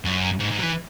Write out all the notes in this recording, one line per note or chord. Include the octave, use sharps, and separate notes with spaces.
F#2
G#2
G#2
F#3
E3